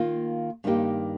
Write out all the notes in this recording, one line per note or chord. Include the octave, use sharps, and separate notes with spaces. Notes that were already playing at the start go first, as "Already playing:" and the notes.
Already playing: D#3 A#3 F4
G2 D#3 A#3 D#4 G4